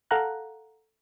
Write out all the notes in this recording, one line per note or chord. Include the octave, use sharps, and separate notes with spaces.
A4 F5 F#5 A#5 F#6